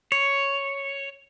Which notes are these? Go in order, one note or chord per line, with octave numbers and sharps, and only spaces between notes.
C#5